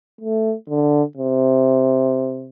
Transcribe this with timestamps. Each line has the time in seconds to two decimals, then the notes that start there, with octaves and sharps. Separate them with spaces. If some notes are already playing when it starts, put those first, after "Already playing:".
0.21 A3
0.69 D3
1.17 C3